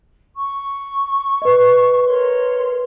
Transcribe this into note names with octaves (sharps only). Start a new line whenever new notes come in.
C#6
B4 D#5
A#4 C#5 C6